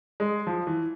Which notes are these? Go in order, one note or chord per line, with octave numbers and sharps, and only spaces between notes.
G#3
F3
E3